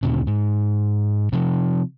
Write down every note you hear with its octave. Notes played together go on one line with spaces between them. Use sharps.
D2 A#2 C#3
G#2
C3 F3